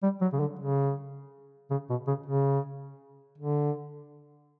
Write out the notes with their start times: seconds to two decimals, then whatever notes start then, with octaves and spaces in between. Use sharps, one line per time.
0.03 G3
0.21 F#3
0.33 C#3
0.40 D3
0.59 C#3
1.71 C#3
1.90 B2
2.07 C#3
2.26 C#3
3.38 D3